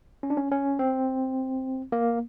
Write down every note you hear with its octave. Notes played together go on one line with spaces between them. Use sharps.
C#4
D4
C#4
C#4
C4
A#3